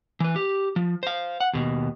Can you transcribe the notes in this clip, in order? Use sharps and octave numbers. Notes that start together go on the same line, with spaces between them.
E3 B4
G4
F3
C5 F5
F#5
D#2 B2